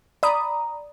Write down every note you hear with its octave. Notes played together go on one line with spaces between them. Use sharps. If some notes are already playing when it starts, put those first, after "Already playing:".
D5 A#5 B5 D#6